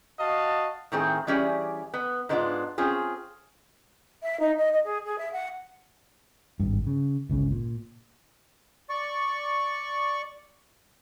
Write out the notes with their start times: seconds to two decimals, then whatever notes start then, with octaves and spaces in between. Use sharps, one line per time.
0.19 F#4 D#5 F5 A5
0.92 A2 D#3 C4 G#4
1.27 E3 G3 C#4 G4 G#4 D5
1.94 B3
2.29 G#2 G#3 B3 D4 D#4 F4
2.78 C4 C#4 F4 G#4
4.23 E5
4.40 D#4
4.57 D#5
4.73 D#5
4.84 G#4
5.05 G#4
5.18 E5
5.33 F#5
6.60 G#1 G2
6.87 C#3
7.29 G1 C#2 C#3
7.51 A#2
8.90 D5 C#6